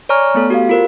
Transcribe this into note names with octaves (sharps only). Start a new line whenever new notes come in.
C#5 D5 G#5 A#5 C#6 F6
A3 B3 A4
F#4 G4 F5
F4 A#4 C5